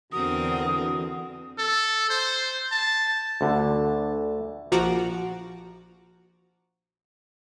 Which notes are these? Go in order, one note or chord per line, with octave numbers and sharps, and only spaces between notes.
E2 D3 C4 F#4 A#4 D#6
A4
C5
A5
D2 D3
A#1 F3 F#4 A#5 D6